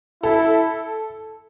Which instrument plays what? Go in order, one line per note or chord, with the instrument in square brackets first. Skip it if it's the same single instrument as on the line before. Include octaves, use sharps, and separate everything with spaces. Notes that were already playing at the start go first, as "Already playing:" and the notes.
[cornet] E4 [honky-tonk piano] A4